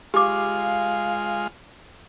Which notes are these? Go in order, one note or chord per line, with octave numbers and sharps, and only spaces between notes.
G#3 F4 G4 F5 D6